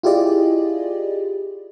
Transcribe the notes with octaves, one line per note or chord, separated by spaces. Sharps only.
E4 F4 G4 G#4 D5 D#5